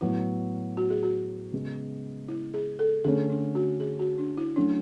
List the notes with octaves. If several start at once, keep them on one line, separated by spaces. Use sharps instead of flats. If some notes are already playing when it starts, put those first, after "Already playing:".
A2 F#3 B3 E4
F#4
G#4
F#4
C#3 G#3 B3
E4
G#4
A4
D3 A3 C#4 G#4
D4
F#4
G#4
F#4
D4
E4
F#3 A3 C#4 D4